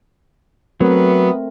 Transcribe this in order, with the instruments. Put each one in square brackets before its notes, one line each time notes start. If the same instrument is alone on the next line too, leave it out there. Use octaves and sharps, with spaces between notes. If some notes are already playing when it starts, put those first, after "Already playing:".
[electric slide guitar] F#3 [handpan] A3 C4 A#4 [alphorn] B3